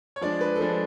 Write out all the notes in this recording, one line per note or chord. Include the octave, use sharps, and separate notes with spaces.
C#5
F3 G#3 D4 D5
B4
A4
F3 G#3 D4 B4